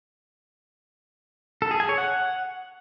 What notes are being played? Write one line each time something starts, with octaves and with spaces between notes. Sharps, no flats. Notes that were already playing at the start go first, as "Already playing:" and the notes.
A4
G#4
G#5
C#5
F#5